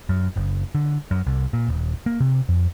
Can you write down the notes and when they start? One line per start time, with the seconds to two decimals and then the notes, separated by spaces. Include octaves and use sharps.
0.09 F#2
0.36 F#1
0.75 D3
1.11 F#2
1.26 C2
1.53 A#2
1.68 D#1
2.06 A#3
2.20 C3
2.48 F2